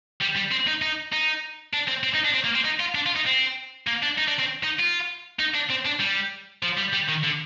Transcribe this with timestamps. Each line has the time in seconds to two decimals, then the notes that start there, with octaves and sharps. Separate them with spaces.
0.21 G3
0.36 G3
0.51 C4
0.67 D#4
0.82 D#4
1.13 D#4
1.73 D4
1.88 C4
2.04 C4
2.15 D#4
2.25 D4
2.34 C4
2.45 A#3
2.55 C4
2.65 D#4
2.80 F4
2.95 D4
3.06 F4
3.16 D#4
3.26 C4
3.87 A#3
4.03 D4
4.18 D#4
4.28 D4
4.39 C4
4.63 D#4
4.79 F4
5.39 D#4
5.55 D4
5.70 C4
5.86 D4
6.00 G3
6.63 F3
6.77 G3
6.93 G3
7.08 D#3
7.23 D3